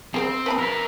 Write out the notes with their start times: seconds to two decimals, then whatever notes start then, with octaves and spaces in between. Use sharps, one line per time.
0.14 C4 G#4 A#4 C5
0.46 B4 A5 B5
0.59 A#4 E5